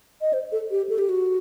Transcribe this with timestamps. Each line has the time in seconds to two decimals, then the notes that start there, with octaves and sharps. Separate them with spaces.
0.21 D#5
0.33 C5
0.52 A4
0.71 G4
0.89 A4
0.98 G4
1.09 F#4